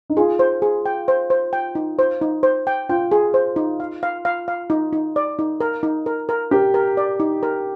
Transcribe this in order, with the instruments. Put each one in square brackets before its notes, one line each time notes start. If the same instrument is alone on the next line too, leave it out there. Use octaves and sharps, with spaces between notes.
[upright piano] D#4
[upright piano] F4 [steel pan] G#4
[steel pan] C5
G#4
G5
C5
C5
G5
D#4
C5
D#4
C5
G5
[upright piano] F4 [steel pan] G5
[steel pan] G#4
C5
D#4
F5
F5
F5
F5
D#4
D#4
D5
D#4
A#4
D#4
A#4
A#4
[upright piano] G4 [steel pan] A#4
[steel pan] A#4
D5
D#4
A#4